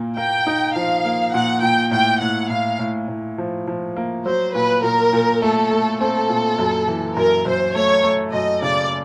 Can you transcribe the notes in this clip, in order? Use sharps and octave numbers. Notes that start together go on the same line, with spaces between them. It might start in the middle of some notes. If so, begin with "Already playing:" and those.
Already playing: A#2 A#3
A#3 G5
D#4
F3 F5
A#3
A#2 F#5
A#2 G5
A2 G5
A2 F#5
A2 F5
A2
A2
F3
F3
A#3
F#3 C5
A#2 B4
A#2 A#4
A#2
A3 A4
A3
C4 A4
A#2
F#2
E3
F#2 A#4
F#2 C5
A3 C#5
A3
F#2 D#5
C#3 D5